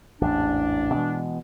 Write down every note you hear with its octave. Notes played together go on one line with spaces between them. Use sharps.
A1 E2 G#2 D4
B2 E3 G#3